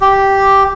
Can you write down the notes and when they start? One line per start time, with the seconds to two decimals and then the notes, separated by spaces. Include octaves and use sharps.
0.01 G4